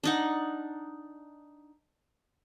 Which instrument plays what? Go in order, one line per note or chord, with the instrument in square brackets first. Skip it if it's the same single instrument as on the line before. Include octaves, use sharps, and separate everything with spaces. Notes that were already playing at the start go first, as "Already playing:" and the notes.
[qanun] D4 D#4 F#5